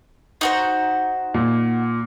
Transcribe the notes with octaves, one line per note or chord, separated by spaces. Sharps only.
D#4 F#4 C5
A#2